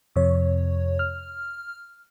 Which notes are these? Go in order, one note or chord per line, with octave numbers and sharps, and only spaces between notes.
F2 C3 C#5
F6